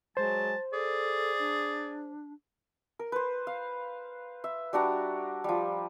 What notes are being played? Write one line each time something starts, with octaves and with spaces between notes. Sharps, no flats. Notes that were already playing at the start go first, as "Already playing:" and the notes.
F#3 G#3 C5 A5
G#4 A4 D5
D4
A#4
B4 C5
F5
E5
G3 D4 F#4 A#5
F3 G3